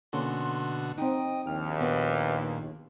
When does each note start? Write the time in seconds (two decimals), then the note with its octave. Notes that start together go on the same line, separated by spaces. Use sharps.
0.13 B2 D3 A#3 C#4 F#4 A4 C6
0.98 C4 D#4 D#5 G5
1.47 A#1 D#2 F6
1.81 A#2 B3 B4